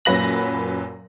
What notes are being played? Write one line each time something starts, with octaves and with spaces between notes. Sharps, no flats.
F#2 A#2 F#3 B4 A#6 F#7